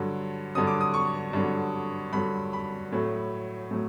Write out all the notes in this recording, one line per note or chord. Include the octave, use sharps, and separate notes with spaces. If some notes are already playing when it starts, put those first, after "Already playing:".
Already playing: G2 D3 F#3
G2 D3 F#3 D#6
D6
D#6
C#6
G2 D3 F#3
G2 D3 F#3 B5
B5
A2 F#3 A3
A2 F#3